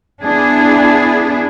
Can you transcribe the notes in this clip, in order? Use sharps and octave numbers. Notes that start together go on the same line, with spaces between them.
B3 D4 E4 G#4